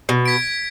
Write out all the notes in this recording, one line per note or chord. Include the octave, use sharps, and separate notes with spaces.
B2
G#6 B6 D7